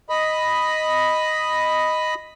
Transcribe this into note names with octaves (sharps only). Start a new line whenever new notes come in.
D#5 B5